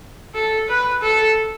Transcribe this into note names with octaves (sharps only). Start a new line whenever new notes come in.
A4
B4
A4